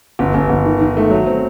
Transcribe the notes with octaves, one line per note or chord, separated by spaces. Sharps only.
G1
G1
G1
D#3
D#3
A3
F#3
C4